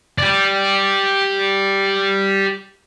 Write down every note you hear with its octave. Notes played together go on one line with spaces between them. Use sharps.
G4 D5